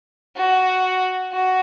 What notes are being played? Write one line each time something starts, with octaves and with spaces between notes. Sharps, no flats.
F#4
F#4